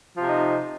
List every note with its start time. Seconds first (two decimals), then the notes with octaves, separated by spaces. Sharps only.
0.17 F3
0.22 C3
0.26 D#4